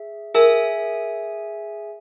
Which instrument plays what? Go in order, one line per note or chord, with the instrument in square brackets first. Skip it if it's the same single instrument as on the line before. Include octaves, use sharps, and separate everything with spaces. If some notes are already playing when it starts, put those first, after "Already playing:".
Already playing: [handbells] G#4 E5
[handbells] G#4 E5 G#5 [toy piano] A#4